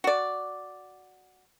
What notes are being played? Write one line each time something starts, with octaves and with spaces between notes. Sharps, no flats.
F#4 D5